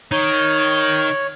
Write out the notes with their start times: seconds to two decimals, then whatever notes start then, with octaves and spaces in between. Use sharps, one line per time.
0.12 D#3 C#5